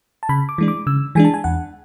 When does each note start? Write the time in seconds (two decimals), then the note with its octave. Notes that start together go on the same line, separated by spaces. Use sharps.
0.23 A5
0.29 C#3 B5
0.49 D6
0.58 E3 G#3 D4
0.68 D6
0.87 C#3 E6
1.15 E3 G#3 D4 G#5
1.25 A5
1.34 G#5
1.44 E2 F#5